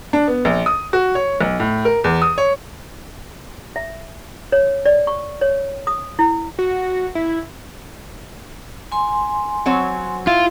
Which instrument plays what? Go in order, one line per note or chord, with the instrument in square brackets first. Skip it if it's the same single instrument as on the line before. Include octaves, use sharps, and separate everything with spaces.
[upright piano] D4
B3
A#1
D#6
F#4
C#5
B1
A2
A#4
E2
D#6
C#5
[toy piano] E5
C#5
D5
C#6
C#5
D#6
E4
[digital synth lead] F#4
E4
[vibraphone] G#5 C6
[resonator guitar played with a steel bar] F#3 C4 C#5
[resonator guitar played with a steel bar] E4 [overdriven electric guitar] F4